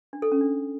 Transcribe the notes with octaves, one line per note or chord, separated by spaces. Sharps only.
D4
A4
C#4
D4